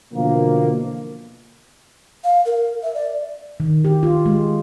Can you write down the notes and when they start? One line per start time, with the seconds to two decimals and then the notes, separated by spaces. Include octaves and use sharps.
0.13 B2 D3 E3 F3 A#3
2.24 F5
2.46 A#4
2.83 E5
2.94 D5
3.60 D#3
3.85 G4
4.03 F4
4.26 G#3